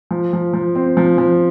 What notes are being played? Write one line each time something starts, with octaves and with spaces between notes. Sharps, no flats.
F3
F3
F3
C4
F3
F3